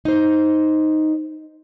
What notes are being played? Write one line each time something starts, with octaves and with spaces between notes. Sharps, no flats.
D#4 C5